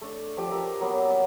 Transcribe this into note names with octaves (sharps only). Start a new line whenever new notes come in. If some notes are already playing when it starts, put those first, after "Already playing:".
A3 D4
F3 G4
G4 A#4 E5
F#3 A#3 B3
D5 E5